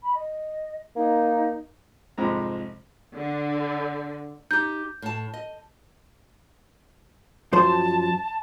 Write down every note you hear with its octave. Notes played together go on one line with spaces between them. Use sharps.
B5
D#5
A#3 D#4
C2 F2 G#2 G#3 A#5
D3
D#4 G4 G6
A2 A5
D#5
F#2 F3 C5 A5